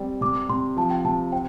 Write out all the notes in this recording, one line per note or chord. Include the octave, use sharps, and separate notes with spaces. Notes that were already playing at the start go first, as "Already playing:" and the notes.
Already playing: G3 C4
C3 D6
C3 C6
F3 A5
G5
C3 A5
C5 G5